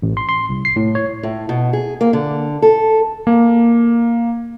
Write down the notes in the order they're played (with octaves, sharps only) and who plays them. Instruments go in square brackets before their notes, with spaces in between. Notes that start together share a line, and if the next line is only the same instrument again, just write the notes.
[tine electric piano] A1
C6
C6
C2
C7
A2
C#5
[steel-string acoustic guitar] A2
B2
G#4
A#3
D3
A4
[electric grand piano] A#3